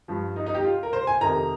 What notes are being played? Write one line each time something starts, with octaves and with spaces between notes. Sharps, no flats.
G2 F3
D#4
D#4
G4
F4
A#4
C5
G#5
F2 C3 D#3 A#5